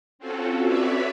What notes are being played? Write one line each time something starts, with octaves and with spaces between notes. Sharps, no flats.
C4 C#4 F4 F#4 A4
B4 C#5 D5 E5 B5